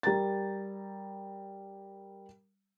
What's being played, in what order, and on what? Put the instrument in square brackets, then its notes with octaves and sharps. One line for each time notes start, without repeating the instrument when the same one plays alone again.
[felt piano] G3 A#4 A#5 A6